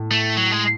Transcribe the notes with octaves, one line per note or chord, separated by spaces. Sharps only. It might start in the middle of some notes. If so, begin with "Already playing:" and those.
Already playing: A2
A3
F#3
G#3